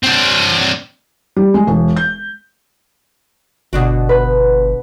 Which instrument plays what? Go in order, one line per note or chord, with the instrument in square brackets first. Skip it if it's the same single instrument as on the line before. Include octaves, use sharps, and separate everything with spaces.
[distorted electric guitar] C4 D4
[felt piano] G3
G#3
E1
G6
[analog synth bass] G1 [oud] B2 D4 F#4
[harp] B4